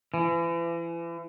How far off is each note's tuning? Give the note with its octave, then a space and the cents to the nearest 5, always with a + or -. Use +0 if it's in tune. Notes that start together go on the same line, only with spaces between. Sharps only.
E3 +35